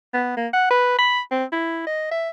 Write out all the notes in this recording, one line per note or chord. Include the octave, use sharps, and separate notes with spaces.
B3
A#3
F#5
B4
B5
C4
E4
D#5
E5